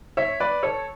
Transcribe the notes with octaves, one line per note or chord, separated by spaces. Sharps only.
C#5 E5
B4 D5
A4 C#5